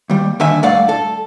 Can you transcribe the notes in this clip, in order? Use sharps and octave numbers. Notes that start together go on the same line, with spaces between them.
D#2 G3
D#2 D3 D#3 E5 G#5
G2 A3 D5 F5 F#5
A4